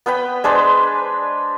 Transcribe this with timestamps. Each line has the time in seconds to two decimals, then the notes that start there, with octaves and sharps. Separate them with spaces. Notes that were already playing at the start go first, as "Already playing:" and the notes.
0.06 B3 B4 G5 B5
0.44 G#3 D4 B4 C5